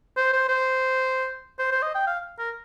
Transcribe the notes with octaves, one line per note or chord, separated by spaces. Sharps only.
C5
C5
C5
C5
C5
D#5
G5
F5
A#4